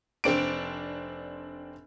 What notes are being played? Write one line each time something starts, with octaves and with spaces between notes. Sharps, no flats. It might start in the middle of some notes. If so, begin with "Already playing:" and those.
F1 C4 D4 D7